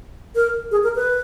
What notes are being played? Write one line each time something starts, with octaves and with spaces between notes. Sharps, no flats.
A#4
G#4
A#4
B4